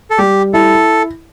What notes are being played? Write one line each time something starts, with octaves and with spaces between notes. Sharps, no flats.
A4
G3 G4
E4 A4